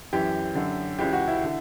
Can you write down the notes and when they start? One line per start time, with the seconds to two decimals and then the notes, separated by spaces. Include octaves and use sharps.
0.13 F#2 E3 G4
0.55 F#2 D3
0.98 C#2 C#3 E3 G4
1.13 F#4
1.28 E4
1.44 D3